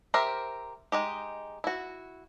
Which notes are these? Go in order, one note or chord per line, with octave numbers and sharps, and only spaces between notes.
G4 A#4 C5 E5
G#3 D#4 G4
E4 F#4